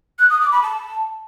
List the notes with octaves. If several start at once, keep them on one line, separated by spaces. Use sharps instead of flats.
F#6
D#6
D6
B5
A5